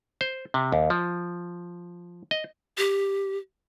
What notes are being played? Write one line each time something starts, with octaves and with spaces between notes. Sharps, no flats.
C5
C3
D#2
F3
D#5
G4